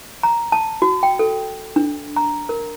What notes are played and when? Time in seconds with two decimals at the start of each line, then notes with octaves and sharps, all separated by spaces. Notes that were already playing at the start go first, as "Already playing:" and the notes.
0.23 A#5
0.52 A5
0.82 F#4
1.03 G5
1.19 A4
1.76 D4
2.16 A#5
2.49 A#4